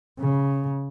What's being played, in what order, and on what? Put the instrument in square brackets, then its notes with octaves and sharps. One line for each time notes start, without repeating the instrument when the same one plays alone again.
[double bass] C#3